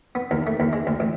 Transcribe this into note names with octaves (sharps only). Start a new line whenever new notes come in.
B3
D#2
A3
D#2
G#3
D2
A1